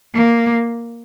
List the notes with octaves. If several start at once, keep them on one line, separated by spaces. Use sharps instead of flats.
A#3